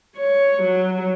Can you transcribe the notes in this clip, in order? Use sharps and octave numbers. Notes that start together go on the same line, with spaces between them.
C#5
F#3